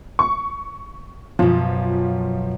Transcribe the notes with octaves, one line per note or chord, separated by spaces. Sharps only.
C#6
F#2 B2 F3